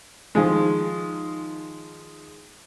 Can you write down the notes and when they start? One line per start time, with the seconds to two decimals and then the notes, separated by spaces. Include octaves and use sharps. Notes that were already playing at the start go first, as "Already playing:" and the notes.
0.35 D#3 F3 G#3